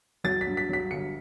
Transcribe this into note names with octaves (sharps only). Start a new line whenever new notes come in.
F#3 A6
B6
G2
B6
F#3 B6
G1 C#7